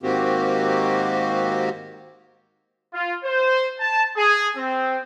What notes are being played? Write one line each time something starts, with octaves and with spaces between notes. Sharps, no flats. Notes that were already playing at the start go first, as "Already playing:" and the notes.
G#2 D#3 A#3 C4 F#4 G4
F4
C5
A5
G#4
C4